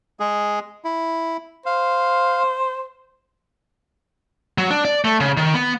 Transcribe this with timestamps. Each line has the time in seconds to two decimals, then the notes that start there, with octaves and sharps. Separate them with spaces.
0.20 G#3 G#4
0.84 E4
1.66 C5 F5
4.58 F#3
4.70 D4
4.85 D5
5.05 A3
5.20 C#3
5.37 D#3
5.54 B3